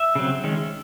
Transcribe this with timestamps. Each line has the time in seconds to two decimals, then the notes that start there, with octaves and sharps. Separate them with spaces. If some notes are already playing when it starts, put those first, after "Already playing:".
Already playing: E5
0.15 C#3 F#3 C4
0.44 D#3 G#3 C#4